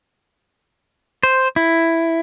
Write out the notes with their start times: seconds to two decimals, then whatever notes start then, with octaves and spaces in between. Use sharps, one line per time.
1.23 C5
1.56 E4